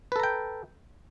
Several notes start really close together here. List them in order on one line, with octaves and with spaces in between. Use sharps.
B4 A4 A#5 G5